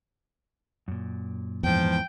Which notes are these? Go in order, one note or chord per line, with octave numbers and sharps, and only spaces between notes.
F#2 A#2
E2 G#2 F3 G5